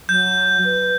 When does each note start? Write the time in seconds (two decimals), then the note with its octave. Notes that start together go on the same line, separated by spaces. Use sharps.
0.09 F#3 G6
0.64 B4